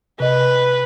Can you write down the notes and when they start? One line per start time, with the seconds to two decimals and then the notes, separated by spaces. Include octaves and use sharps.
0.20 C3 B4 D#5